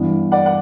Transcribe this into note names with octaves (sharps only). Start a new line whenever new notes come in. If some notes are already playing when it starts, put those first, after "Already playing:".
Already playing: G2 E3 B3
D5 F#5
F#5